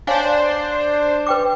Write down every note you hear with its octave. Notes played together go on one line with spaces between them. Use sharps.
D4 C5 C#5 F5 G#5
B4 G5 D6